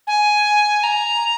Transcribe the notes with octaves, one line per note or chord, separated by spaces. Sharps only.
G#5
A#5